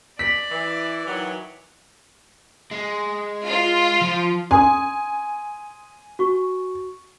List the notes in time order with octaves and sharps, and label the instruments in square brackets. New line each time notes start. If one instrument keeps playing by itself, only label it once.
[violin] D5 [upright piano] B6
[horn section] E3
D#3 E3 F#3
[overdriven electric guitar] G#3
[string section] F4
[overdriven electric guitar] F3
[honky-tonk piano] G#5 [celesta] C6 D#6
[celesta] F#4 C#6